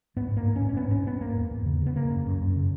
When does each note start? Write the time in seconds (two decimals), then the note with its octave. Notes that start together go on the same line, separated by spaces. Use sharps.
0.16 G#2 B3
0.31 G#2
0.37 A#3
0.46 G#2
0.56 C#4
0.62 G#2
0.69 C#4
0.76 G#2 B3
0.91 G#2 C#4
1.06 G#2 B3
1.21 G#2 A#3
1.36 E2
1.51 E2
1.66 C#3
1.81 C#3
1.86 B3
1.96 C#3 A#3
2.11 F#2
2.26 F#2
2.41 F#2
2.56 C#3